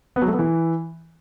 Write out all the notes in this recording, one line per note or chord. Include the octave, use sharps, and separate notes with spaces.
B3
F#3
A3
B3
E3